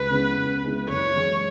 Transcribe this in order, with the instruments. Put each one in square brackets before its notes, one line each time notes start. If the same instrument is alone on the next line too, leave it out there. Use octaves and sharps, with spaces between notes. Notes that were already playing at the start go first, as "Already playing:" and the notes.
Already playing: [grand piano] C#2 [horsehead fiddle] B4
[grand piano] C#3 G#3 B3 E4
C#2
C#3 G#3 B3 E4
[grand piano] F#1 [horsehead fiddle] C#5
[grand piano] F#2 E3 G#3